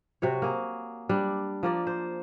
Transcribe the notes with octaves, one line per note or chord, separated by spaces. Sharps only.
C3 F#4 C#5
A#3 G#4
G3 D4
F3 A#3 D5
C5